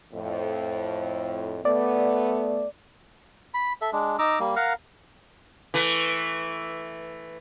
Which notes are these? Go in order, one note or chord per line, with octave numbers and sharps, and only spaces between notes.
F2 A2
A3 B3 D5
B5
A4 E5
G#3 D4
D#4 A#5 D6 E6
G3 A#3
A#4 F5 F#5 A#5
E3 A3